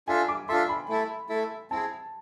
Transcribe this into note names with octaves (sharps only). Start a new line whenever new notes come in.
D4 F4 A4 E5 G#5
D6
D4 F4 A4 E5 C6
B5
A3 E4 A4 E5
A3 E4 A4 E5
C4 E4 G#4 A5